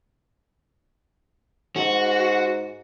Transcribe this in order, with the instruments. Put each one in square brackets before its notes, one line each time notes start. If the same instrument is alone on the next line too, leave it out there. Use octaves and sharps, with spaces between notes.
[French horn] G#2 [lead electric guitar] F#4